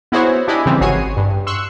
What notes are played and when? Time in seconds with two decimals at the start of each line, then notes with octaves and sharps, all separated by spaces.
0.12 B3 E4 F#4 G#4 C5 C#5
0.47 D4 E4 G4 D#5 G#5 B5
0.66 C#3 E3 F3 G3 C4
0.81 G#1 F#4 G#4 C#5 C7 D#7
1.17 G2
1.47 C6 C#6 E6 F#6